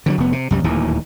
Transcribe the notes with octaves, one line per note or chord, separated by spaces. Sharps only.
D3 E3 F#3
F1 B3
C3
C2 F#2 G3
D1 D#2 A#2 E3